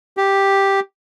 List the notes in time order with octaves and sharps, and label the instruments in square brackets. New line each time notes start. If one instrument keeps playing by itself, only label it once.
[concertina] G4